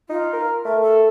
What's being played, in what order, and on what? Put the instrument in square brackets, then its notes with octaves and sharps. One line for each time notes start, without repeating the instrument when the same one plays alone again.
[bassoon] D#4 [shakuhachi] F4
[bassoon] A#4
[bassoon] A3 [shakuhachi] A#4
[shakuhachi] A4